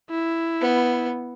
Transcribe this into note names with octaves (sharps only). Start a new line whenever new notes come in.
E4
B3